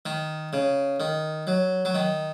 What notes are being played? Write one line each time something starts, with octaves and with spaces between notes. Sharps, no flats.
D#3
C#3
D#3
F#3
F#3
D#3